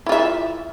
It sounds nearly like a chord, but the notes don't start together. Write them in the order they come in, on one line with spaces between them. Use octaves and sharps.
E4 F4 E5